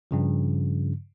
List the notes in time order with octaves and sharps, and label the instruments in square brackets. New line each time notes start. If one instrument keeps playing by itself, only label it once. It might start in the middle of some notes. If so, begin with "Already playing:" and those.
[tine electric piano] G2 C#3 F3